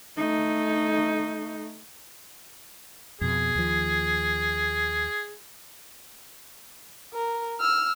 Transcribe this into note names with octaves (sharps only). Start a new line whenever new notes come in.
A3 D#4
F2 B2 G#4
D#2 F3
A#4
E6 F6